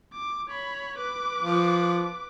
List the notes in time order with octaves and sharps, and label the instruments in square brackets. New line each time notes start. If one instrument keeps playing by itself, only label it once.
[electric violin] D6
C#5 B5
B4 D6
[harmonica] F3